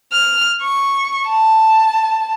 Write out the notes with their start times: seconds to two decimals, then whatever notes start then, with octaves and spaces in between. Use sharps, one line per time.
0.13 F6
0.62 C#6
1.30 A5